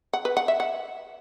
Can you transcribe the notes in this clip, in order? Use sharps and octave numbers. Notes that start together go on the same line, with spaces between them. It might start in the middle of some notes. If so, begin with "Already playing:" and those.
F#5
B4
F#5
E5
F#5